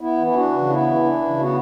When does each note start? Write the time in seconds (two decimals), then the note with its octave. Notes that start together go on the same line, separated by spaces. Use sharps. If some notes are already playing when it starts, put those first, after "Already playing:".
0.01 B3 E4
0.18 E3
0.27 E4
0.35 D4 F#4
0.52 C#3
0.69 B3 E4
0.87 E3
1.03 D4
1.20 C#3
1.38 B3 F#4